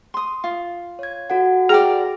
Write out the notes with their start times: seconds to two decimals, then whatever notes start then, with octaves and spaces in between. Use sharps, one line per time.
0.14 C6 D#6
0.44 F4
0.99 C#5 G#6
1.30 F#4 A4 F#5
1.69 G#4 D5 G5 A#5